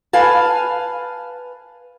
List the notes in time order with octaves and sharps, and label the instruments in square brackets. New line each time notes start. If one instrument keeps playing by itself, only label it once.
[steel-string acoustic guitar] B4 F5 G#5 A5